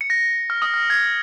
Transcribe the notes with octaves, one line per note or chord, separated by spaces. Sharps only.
C#7
A#6
F6
D#6
F6
G#6